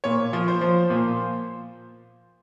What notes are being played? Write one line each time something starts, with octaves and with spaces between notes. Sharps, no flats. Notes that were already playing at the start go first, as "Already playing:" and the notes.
A#2 C#5
F3
C5
F3
A#2